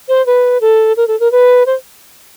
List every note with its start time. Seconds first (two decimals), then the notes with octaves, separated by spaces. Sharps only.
0.08 C5
0.26 B4
0.61 A4
0.97 A#4
1.08 A4
1.20 A#4
1.32 B4
1.66 C5